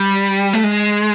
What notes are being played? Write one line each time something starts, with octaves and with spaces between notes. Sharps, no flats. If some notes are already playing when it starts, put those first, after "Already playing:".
Already playing: G3
A3
G#3